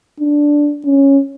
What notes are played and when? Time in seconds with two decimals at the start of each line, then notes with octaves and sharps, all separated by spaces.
0.20 D4
0.85 C#4